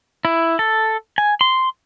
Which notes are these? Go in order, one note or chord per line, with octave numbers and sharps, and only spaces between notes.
E4
A4
G#5
C6